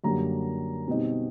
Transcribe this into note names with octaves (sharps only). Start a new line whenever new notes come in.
F#2 D3 G3 A#3 A#5
B2 G3 C4 D#4